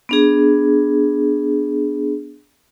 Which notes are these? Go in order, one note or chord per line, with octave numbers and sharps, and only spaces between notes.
B3 D4 G#4